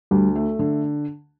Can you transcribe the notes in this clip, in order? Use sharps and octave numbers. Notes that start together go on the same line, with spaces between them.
D2 G3
A3
D3